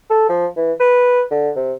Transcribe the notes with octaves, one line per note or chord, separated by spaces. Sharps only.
A4
F3
E3
B4
D3
C3